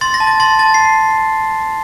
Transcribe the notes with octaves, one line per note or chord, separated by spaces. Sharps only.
C6 A6
A#6
A5
A6
C6 A6
A5 A6
C7